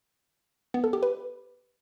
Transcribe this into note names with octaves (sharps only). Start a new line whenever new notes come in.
B3
A4
G4
B4